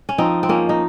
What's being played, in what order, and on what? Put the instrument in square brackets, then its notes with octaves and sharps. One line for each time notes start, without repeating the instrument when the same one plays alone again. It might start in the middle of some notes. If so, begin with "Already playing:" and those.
[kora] C#4
[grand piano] F3 [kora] C4 D#4
[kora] C4
[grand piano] F3 [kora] A#3 C#4
[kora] D#4